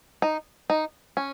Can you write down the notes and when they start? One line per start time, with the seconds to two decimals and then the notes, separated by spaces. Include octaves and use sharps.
0.22 D#4
0.70 D#4
1.17 C#4